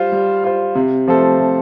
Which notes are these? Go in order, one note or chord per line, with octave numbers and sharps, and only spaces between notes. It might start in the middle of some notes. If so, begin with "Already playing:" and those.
Already playing: G3 F4 C5
G3
F4 C5
C3
F3 A3 C4 A4
C3